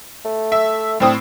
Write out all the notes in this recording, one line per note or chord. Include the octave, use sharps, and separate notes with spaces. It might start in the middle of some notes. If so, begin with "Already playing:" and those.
A3
E5
A2 C4 D4 D#6